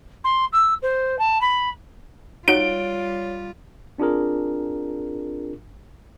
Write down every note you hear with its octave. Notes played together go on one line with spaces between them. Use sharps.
C6
E6
C5
A5
B5
G3 D#4 F4 F#4 C#5 D7 G7
C4 D4 F4 G#4 A#4